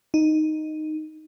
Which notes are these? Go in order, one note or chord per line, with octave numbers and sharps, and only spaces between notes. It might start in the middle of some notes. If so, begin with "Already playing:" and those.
D#4